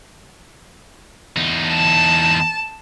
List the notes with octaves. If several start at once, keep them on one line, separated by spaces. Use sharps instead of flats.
E2 D#4
A5